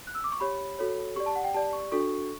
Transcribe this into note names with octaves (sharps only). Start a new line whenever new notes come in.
F#6
E6
D6
C#6
G4 C#5 B5
F#4 A4 C#5
G4 D5 C#6
A5
F#5
G5
G4 D5 A5
C#6
D4 F#4 A4 C#6